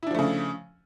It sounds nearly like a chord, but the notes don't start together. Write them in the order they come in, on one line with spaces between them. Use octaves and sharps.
E4 D4 F3 A3 C#3